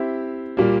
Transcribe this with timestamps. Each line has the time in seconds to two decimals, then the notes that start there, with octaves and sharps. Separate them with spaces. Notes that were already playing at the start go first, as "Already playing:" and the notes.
Already playing: C4 E4 G4 C5 E5
0.57 A#2 G3 A#3